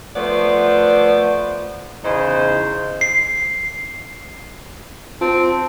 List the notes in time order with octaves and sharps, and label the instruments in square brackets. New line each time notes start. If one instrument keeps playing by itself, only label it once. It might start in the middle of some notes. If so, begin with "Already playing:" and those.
[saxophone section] F3 A3 B3 C5 D5
E2 C#3 D#4 C5
[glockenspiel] C7
[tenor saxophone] C4 [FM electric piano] F4 A5